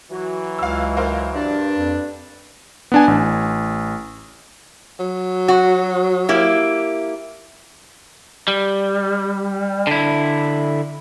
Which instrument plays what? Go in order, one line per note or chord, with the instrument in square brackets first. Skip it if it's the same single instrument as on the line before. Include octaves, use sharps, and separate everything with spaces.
[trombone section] E3 F#3 [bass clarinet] F#4
[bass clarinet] C#2 [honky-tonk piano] F5 E6
[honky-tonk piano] A#4 C5 F5
[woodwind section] G2 D4
[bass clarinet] F2
[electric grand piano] B3 D4 G#5
A1
[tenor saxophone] F#3
[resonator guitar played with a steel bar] F#4
A#3 E4 G4
[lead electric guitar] G3
D3 E4